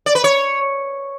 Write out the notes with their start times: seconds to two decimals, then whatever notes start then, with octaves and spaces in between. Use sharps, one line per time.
0.06 D5
0.15 B4
0.24 C#5